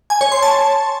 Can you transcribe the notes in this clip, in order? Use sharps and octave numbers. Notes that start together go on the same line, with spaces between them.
G#5
C#5
C6
A5